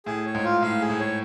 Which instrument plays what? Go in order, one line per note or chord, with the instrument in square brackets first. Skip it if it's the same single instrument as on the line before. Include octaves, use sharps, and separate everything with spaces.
[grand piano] A2 [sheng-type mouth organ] G#4
[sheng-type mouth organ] C#5
[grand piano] G#2
[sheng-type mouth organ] F4
[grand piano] A2 [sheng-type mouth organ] F5
[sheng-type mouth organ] G#4
[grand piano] A2
[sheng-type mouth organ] C#5